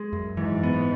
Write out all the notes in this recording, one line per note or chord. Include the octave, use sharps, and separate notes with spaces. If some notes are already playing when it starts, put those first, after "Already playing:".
Already playing: G#3
F#2
G#2 E3
B3